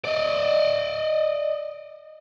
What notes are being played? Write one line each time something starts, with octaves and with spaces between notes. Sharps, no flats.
D5 D#5